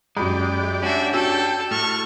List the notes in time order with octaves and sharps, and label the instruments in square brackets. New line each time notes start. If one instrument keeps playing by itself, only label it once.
[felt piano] F#2 F#4 B5 [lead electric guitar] G#3 [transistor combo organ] G4 D5
[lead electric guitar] C#4 D4 [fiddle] F#4 E5
[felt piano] F#4 E6 [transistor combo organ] G4 G5 [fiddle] A4
[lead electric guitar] A2 [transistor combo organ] A4 F6 [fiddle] C#6